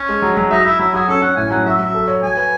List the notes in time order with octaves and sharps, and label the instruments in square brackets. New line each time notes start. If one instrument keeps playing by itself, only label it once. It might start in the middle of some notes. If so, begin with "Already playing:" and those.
Already playing: [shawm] C#4
[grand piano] G#3
F#3
F#3
[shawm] D#4 [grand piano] E5
[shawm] E4 [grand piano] E5
[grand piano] F#3 [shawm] E4
[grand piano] F#4 [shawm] G#4
[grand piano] C#4 [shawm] A4
[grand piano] C#4 [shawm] F#5
[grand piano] A2 [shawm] G#5
[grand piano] F#3 [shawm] F#5
[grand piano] F#4 [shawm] E5
[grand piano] F#3
A4
C#5
[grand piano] F#3 [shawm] G#5
[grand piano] B4